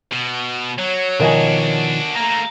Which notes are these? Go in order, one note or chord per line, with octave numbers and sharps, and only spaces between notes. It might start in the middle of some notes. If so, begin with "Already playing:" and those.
B2
F#3 C#5
B2 D#3 F3 D4 F#4 A#4 D#5 G#5
A3 A#3 A#5